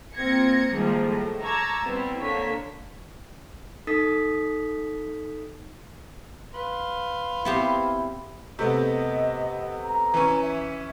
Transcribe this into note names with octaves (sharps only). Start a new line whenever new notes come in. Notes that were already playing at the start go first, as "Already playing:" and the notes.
A#3 C4 F4 G#6 A#6 C#7
C3 D#3 F3 G3 G#3 A#3
A2
A5 A#5 C#6 D6 E6 G#6
G3 B3 C4 E4
D3 A#3 C#5 B6
D#4 A4 D#6 A6 B6
B4 F5 C6
B3 C4 E4 G4
C3 A3 B3 D#5
A#5
E3 C#4
E5